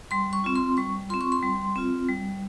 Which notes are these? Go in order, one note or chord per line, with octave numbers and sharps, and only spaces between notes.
G3 C6
C#6
C4 F4
C6
G3 C#6
C4 F4 C6
C#6
C6
G3
C4 F4
G3